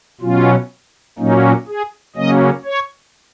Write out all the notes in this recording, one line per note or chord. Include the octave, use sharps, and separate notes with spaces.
B2 F#3 C#4 F4
A#2 F#3 A#3 C#4 D#4
G#4
C#3 F#3 A#3 C#4 D#5
C#5